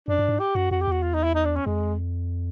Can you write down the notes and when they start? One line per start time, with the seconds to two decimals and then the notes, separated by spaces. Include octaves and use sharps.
0.08 F#2 D4
0.19 G2
0.28 G#2
0.39 G4
0.55 F#2 F#4
0.71 F2 F#4
0.82 G4
0.88 E2 F#4
1.03 F4
1.14 D#4
1.24 E4
1.35 D#4
1.45 D4
1.56 C#4
1.66 F2 G#3